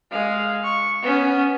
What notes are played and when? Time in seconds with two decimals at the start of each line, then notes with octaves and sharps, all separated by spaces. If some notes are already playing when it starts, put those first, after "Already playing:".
0.11 G#3 F5
0.63 C#6
1.02 B3 C#4